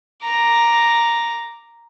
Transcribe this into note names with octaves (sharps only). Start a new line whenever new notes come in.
A#5 D6